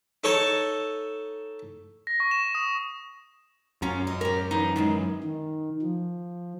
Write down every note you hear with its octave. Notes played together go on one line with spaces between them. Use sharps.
D#4 A4 C#5 A5
A#6
C#6
E7
D#6
F#2 C#4 F4 A#5
D#5
G4 A#4
E3 D#4
D#3 E3 G#3
D#3
F3